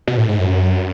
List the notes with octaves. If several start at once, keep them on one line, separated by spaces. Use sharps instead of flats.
B2
A2
G#2
F#2